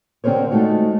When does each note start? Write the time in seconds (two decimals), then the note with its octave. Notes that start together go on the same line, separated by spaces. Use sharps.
0.24 D3 C4 G#4 A#4 C5 C#5
0.51 G#3 A3 D#4 F4 F#4